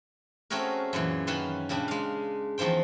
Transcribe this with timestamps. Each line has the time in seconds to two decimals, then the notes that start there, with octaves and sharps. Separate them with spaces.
0.50 A3 C4 C#4 F#4 G#4 A#4
0.93 F#2 A#2 E3
1.27 D#3 C#4 B4 F#5 A5 C6
1.69 A#2 C#3 G3 D4
1.88 G#3 F5
2.58 E2 D#3 F3 C5 G5